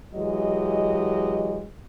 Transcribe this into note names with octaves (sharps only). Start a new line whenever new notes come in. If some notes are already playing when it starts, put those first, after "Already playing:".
E3 F#3 G#3 G4 D#5